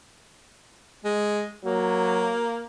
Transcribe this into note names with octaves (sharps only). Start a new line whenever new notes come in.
G#3
F#3 A#3